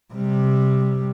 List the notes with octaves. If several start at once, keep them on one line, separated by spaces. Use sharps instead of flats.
C3 G3